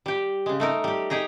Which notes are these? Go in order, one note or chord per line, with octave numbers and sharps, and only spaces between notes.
G3 G4
C#3 G#3
A3 D#4 A#4
G3 G4
D#4 G4 G#4 A#5